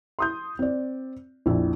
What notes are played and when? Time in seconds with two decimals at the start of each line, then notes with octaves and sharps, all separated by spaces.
0.19 C6 D#6 G6
0.59 C4 D5
1.46 A#1 F2 E4